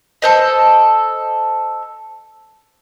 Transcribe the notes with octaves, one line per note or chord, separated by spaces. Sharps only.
A4 C5 D#5